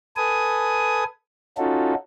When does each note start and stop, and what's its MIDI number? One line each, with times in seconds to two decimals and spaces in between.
0.17 1.04 69
0.17 1.04 71
0.17 1.04 80
0.17 1.04 87
1.58 1.94 61
1.58 1.94 63
1.58 1.94 65
1.58 1.94 66
1.58 1.94 69